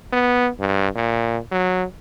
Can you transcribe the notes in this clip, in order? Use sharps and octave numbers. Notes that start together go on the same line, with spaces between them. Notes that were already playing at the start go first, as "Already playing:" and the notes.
B3
G2
A#2
F#3